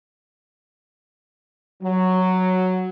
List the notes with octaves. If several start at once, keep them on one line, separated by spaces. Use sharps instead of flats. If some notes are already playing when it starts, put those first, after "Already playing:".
F#3